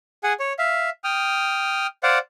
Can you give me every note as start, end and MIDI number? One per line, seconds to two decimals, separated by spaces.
0.23 0.33 68
0.23 0.33 78
0.23 0.33 80
0.40 0.53 73
0.59 0.90 76
0.59 0.90 77
1.04 1.87 79
1.04 1.87 87
1.04 1.87 89
2.03 2.18 72
2.03 2.18 74
2.03 2.18 77
2.03 2.18 78